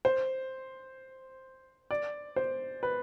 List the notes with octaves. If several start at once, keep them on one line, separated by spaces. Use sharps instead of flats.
C5
D5
C5
B4